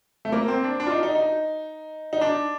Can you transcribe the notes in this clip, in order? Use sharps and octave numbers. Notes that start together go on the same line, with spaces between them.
A3
A#3
C4
D4
D4
F4
D#4
D#4
D#4
D#4
D4